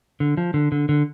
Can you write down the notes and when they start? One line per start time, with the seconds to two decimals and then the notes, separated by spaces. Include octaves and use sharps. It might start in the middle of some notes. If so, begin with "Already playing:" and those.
0.20 D3
0.37 F3
0.54 D3
0.72 D3
0.89 D3